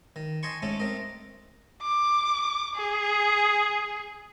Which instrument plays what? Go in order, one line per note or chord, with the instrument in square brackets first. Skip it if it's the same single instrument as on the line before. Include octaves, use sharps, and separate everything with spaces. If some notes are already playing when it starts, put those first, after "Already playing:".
[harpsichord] D#3
D#5 G#5 A5 C6 C#6
G#2 A3 C#4 A4
A3 C4 A#4 D#5
[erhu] D6
G#4